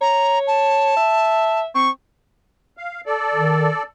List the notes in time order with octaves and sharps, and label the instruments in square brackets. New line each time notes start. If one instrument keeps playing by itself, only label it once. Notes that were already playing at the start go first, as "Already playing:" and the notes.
[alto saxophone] C#5 [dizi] A#5
[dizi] A5
[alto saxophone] E5
[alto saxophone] C4 [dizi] C#6
[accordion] F5
A4 D5
[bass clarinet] D#3